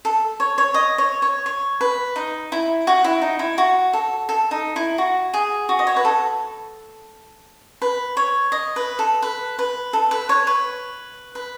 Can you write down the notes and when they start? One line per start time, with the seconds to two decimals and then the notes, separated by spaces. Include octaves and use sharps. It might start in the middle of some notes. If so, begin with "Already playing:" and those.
0.05 A4
0.40 C#5
0.58 C#5
0.74 D#5
0.98 C#5
1.22 C#5
1.46 C#5
1.81 B4
2.16 D#4
2.52 E4
2.87 F#4
3.04 E4
3.22 D#4
3.39 E4
3.58 F#4
3.93 A4
4.29 A4
4.51 D#4
4.76 E4
4.98 F#4
5.34 G#4
5.69 F#4
5.79 D#5
5.87 C#5
5.96 B4
6.05 A4
7.82 B4
8.17 C#5
8.52 D#5
8.76 B4
8.99 A4
9.22 B4
9.59 B4
9.93 A4
10.11 B4
10.29 C#5
10.47 B4
11.35 B4